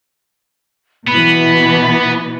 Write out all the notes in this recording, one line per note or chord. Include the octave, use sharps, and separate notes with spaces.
B2 E3 B3 B5